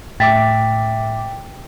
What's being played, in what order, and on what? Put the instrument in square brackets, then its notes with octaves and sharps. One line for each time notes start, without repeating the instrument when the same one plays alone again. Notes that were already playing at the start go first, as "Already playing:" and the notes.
[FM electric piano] A2 E5 D6 [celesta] G5 A6 B6